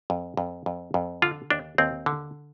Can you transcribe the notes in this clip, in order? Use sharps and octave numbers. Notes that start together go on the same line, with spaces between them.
F2
F2
F2
F2
D3 F4
D#2 D4
D#2 C4
D3